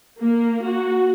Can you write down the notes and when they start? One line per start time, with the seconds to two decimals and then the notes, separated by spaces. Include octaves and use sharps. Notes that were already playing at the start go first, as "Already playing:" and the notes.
0.18 A#3
0.63 F#4